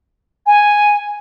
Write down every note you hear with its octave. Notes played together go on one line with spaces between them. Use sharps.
G#5